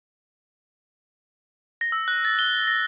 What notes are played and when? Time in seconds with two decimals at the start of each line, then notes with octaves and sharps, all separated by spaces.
1.81 A#6
1.92 E6
2.08 F#6
2.25 A6
2.39 G7
2.67 A#6